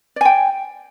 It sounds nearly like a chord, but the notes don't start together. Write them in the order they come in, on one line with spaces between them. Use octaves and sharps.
D5 G#5 G5